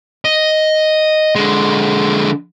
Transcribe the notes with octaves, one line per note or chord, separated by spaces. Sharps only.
D#5
D3 G#3